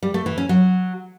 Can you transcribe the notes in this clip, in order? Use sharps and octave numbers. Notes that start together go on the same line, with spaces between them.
G3
A3
E3
C#4
F#3